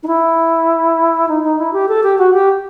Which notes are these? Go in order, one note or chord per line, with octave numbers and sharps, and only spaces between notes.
D#4
E4
D#4
D#4
E4
G4
A4
G4
F#4
G4